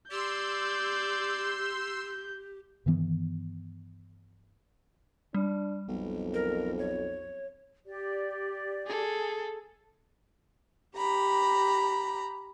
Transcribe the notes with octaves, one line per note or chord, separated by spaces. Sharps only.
G4 D5 C6 E6 G6
G2 D#3 E3 B3
G3 D4
B1 F2
A#4
C#5
G4 D5
G#4 A4
G4 A#5 B5